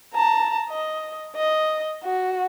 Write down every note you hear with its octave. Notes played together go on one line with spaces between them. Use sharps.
A5 A#5
D#5
D#5
F#4